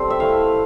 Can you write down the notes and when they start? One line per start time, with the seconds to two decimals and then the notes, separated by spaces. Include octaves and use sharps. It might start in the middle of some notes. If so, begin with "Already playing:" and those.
Already playing: G3 C4 A4 C5
0.10 E5
0.20 A3 E4 F5